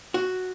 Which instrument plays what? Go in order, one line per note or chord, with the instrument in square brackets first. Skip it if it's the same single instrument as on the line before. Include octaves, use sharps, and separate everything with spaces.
[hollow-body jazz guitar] F#4